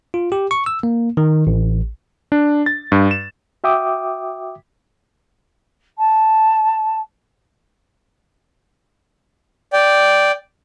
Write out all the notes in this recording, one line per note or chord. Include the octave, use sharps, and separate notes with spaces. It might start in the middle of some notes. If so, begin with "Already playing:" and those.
F4
G4
C#6
E6
A#3
D#3
A1
D4
A6
G2
E7
F#4 E5 G5 D6 D#6
A5
D5 G5